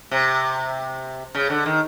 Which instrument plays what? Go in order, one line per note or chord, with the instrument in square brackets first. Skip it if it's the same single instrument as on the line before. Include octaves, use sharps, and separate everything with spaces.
[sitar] C3
C#3
D3
D#3